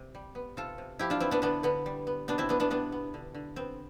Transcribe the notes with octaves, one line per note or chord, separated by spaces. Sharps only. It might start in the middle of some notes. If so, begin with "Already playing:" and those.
Already playing: C3
G3
B3
C3 F4 A4
C3
F3 E4 G4
D4 F4
B3 C4 E4
B3 D4
D3 B3 D4
D3 B3
G3
B3
B2 B3 D4
C4 E4
B2 B3 D4
B3 D4
G3 B3 D4
B3
D3
D3
B3 C4